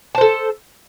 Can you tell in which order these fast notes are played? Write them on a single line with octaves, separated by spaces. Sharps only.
A5 C5 A4